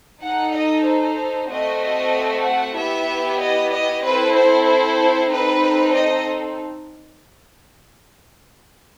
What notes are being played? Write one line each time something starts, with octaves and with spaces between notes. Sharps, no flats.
D#4 A4 F#5
D#5
C5
A3 C4 F#4 D#5
D#5
F#5
B3 E4 G4 E5
D#5
D#5
C4 E4 A4 B4
C5
C5
C4 D#4 A4 B4
D#5